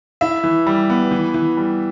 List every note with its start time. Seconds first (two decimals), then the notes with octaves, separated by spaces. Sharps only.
0.21 E4 E5
0.44 E3
0.67 G3
0.90 B3
1.11 E3
1.34 E3
1.57 G3